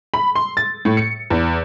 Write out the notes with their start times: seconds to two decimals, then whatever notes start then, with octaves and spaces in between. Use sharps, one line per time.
0.14 B5
0.35 C6
0.57 A6
0.85 A2
0.97 C#7
1.30 E2